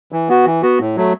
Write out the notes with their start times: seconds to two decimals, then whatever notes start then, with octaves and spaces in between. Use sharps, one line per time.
0.12 E3
0.29 B3 F#4
0.46 E3
0.62 B3 F#4
0.80 A2
0.96 F#3 A3